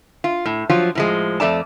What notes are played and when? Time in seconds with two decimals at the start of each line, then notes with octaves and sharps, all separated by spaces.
0.24 F4
0.46 A2
0.70 F3 F#3 F4
0.95 A2 F3 G#3
1.40 F2 A3 D5 A5